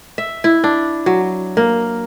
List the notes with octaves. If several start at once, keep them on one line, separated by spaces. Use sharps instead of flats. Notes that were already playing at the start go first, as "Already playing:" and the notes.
E5
E4
D4
F#3
A#3